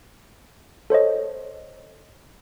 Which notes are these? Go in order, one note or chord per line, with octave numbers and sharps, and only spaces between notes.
A4 C5 C#5 D#5